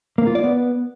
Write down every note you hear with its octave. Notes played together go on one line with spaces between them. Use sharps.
A#3
F4
D5
B3